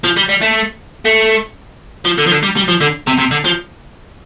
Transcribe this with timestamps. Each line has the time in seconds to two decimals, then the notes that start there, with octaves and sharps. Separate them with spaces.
0.04 F3
0.17 G3
0.29 G3
0.41 A3
1.05 A3
2.05 F3
2.18 D3
2.26 F3
2.31 D3
2.43 G3
2.56 G3
2.68 F3
2.81 D3
3.07 C3
3.18 C3
3.31 D3
3.45 F3